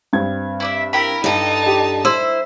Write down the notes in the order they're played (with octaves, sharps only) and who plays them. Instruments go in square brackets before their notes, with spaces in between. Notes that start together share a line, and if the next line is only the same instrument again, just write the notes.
[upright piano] G2 C4 G#6
[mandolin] E4 D5 E5
[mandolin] E4 G5 B5 [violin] A#4
[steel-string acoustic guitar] G2 A4 [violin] D#4 A5
[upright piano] G4
[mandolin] E4 [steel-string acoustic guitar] C5 [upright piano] E6